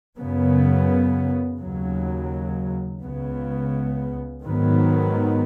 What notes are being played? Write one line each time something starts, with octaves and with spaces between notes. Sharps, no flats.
F#2 C#3 B3
D#2 C#3 F#3
C#2 C#3 B3
G#2 D#3 F#3 B3